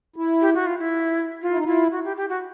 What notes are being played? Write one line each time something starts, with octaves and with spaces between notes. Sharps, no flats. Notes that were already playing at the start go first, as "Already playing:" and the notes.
E4
G4
F#4
F4
E4
F4
E4
D#4
E4 F4
F#4
G4
G4
F#4